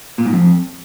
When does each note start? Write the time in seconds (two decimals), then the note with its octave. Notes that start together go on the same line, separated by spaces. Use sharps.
0.18 A#2
0.26 G#2
0.33 F2